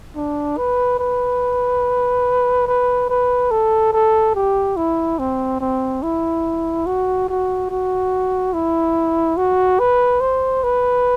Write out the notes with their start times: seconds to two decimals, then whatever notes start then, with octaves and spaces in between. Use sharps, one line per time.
0.16 D4
0.57 B4
0.99 B4
2.67 B4
3.09 B4
3.51 A4
3.93 A4
4.35 G4
4.77 E4
5.19 C4
5.61 C4
6.03 E4
6.86 F#4
7.29 F#4
7.70 F#4
8.53 E4
9.37 F#4
9.79 B4
10.21 C5
10.63 B4